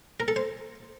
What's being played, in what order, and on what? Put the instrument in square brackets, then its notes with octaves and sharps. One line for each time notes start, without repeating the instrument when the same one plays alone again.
[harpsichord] A#4
A4
C5